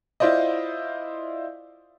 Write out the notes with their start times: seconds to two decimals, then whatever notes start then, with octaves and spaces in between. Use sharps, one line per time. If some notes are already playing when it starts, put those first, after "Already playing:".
0.20 E4 F4 C5 D5 D#5